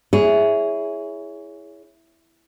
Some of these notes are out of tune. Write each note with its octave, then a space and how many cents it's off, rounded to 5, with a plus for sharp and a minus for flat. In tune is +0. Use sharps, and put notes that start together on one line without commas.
E4 +0 G#4 +0 C#5 +20